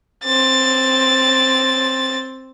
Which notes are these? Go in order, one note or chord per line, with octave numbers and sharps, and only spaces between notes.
C4 A6